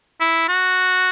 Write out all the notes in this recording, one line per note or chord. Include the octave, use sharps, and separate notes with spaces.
E4
F#4